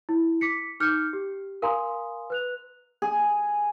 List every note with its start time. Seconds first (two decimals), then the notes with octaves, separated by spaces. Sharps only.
0.09 E4
0.41 D6 B6 C#7
0.80 D#4 D6 F6 G6 C#7
1.13 G4
1.62 A#4 F5 G#5 A#5 C6 D#6
2.30 B4 F#6 F7
3.02 G#4